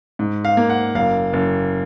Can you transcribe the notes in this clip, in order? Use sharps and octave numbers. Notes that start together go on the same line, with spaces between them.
G#2
F5
A#3
F#5
F#1 F5
F#1